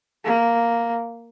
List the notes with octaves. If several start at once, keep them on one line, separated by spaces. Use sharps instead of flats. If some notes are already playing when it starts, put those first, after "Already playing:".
A#3